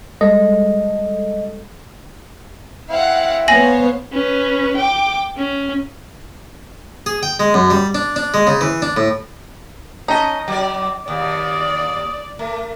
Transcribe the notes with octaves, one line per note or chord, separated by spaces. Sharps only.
G3 G#3 A4 D#5
C4 E4 F5 F#5
B3 C5 C#5 F5 G#5 A#6 F#7
C#4 B4
G5 D6
C#4
G#4
G5
G#3
F#2
G3
D4
D4
G#3
C#3
E3
D4
A2
C#4 D#4 D#5 A5
F#3 D5 D6
D#2 D5 D#6
A3 A#4